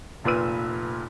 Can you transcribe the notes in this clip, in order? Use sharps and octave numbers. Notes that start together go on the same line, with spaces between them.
F1 A#2 F4 B4 E6 D#7